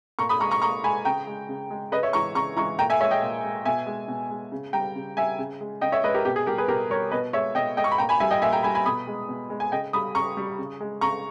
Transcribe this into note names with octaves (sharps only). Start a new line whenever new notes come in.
A#2 A#5 C#6
B5 D#6
G#3 A#5 C#6
A#5 C#6
A#2 A#5 C#6
G#3 G#5 B5
C#3 G5 A#5
G#3
C#3
G#3
C#3 B4 D#5
C#5 E5
E3 G#3 A#5 C#6
C#3 A#5 C#6
E3 G#3 A#5 C#6
A#2 G5 A#5
E5 G#5
G#3 C#5 E5
D#5 G5
A#2
G#3
B2 E5 G#5
G#3
B2
G#3
C#3
G3 G5 A#5
C#3
G3 E5 G#5
C#3
G#3
C#3 D#5 G5
C#5 E5
G#3 B4 D#5
G4 A#4
B2 G4
G#4
G3 G4 A#4
G#4 B4
B2 G4 A#4
G3 A#4 C#5
B2 B4 D#5
G#3 C#5 E5
B2 D#5 G5
G#3 D#5 G5
C#6
B5
A#2 G5 A#5
G#5 B5
G3 E5 G#5
D#5 G5
A#2 E5 G#5
G5 A#5
G3 G#5 B5
G#5 B5
B2 B5 D#6
G#3
B2
G#3
G#5
C#3 D#5 G5
G3 B5 D#6
C#3 A#5 C#6
G3
C#3
G#3
C#3 A#5 C#6